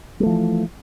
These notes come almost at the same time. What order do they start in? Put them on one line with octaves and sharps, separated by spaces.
G3 A3 F3 E3